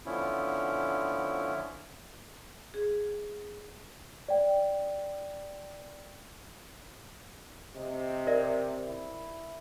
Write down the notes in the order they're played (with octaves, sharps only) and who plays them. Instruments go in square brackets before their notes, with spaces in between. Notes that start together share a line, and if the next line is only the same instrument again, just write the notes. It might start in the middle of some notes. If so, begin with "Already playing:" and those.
[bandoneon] D3 F3 B3 C#4 E4
[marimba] G#4
[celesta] D5 G5
[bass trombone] C3 [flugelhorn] D#5
[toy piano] A#4 D5 E5
[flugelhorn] E4